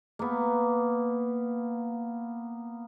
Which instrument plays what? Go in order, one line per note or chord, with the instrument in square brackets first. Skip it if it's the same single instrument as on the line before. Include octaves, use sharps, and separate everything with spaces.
[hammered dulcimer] A#3 B3